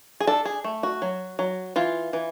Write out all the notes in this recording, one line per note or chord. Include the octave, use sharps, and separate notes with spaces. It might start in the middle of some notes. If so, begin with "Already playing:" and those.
G#4
D4 A4
G#4
A3
F#4
F#3
F#3
E3 F4
E3